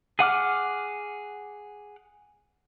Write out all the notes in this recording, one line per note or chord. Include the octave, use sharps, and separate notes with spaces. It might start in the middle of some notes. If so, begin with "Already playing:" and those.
G#4 F#5 D6 F6